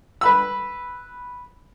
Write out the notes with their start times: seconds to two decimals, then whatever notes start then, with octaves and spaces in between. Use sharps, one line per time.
0.21 B4 B5 E6